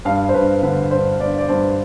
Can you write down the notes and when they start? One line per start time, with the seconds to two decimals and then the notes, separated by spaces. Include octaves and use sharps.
0.05 G2 F5
0.29 C5
0.34 G2 B4
0.63 D3 B4
0.91 G2 C5
1.20 G2 D5
1.38 D5
1.49 G2 C5